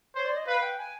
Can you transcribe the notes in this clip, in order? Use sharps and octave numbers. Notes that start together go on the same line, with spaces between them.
C5 C#5
D5
D#5
B4 F5
G5
G#5